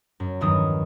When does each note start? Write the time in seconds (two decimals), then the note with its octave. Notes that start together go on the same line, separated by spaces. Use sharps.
0.20 F#2
0.41 E2 G2 D#3 F#3 D#6